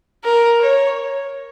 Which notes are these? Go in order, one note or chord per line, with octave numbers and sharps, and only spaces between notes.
A#4
C#5